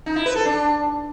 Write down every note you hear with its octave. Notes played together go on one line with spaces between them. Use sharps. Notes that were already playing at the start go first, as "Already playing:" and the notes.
D#4
E4
B4
A4
D4